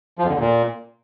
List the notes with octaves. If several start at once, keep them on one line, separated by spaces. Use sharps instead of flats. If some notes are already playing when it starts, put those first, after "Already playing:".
F3
F2
D3
E2
A#2